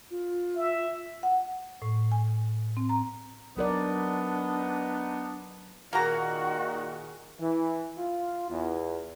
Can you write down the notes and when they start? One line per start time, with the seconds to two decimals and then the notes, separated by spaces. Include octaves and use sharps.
0.10 F4
0.56 E5
1.23 F#5
1.82 A2
2.12 G#5
2.77 C4
2.89 A#5
3.57 F#3 B3 D4 D#4 A#4 D5
5.93 A#2 D#3 A#3 F#4 G#4 A#4 A#5
7.40 E3
7.98 F4
8.50 E2